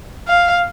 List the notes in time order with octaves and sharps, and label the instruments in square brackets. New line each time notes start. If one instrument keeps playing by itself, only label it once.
[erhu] F5